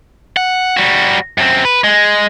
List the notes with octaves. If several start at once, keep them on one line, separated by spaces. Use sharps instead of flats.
F#5
G3 F#4
F#2 C4
B4
G#3